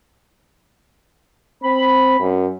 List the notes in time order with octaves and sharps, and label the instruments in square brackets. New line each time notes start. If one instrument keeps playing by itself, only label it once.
[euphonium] C4 [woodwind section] B5
[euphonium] F#2